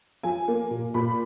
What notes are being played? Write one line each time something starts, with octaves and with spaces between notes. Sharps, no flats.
F3 G#5
A#3
A#2
A#2 B5